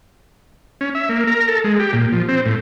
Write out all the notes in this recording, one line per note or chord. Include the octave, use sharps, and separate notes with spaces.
C#4
E5
A#3
A#4
A4
G#3
G4
A#2
F3
C4
A2